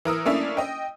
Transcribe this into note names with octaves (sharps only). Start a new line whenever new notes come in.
E3 A#4 D#6 E6
A3 A#3 C#4 D4 E4
D#5 G5